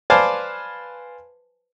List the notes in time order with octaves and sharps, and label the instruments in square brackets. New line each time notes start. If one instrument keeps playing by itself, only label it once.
[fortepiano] B4 C5 D5 F5 G#5 A5